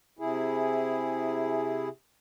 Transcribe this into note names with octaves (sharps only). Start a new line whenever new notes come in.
C3 E4 G#4